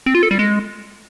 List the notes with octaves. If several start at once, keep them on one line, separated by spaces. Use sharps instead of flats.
C4
F4
A4
G3
G#3